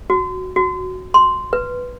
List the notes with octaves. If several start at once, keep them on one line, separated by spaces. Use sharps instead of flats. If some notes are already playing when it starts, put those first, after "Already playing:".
F#4
F#4
C6
B4